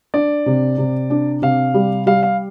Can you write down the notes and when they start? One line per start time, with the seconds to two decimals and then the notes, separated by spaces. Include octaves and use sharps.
0.14 D4 D5
0.46 C3
0.78 C3
1.10 D4
1.42 C3 F5
1.74 G3
2.06 G3 F5
2.23 F5